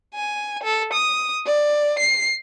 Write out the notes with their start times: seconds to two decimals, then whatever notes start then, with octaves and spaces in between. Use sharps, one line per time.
0.14 G#5
0.63 A4
0.93 D#6
1.46 D5
1.99 C7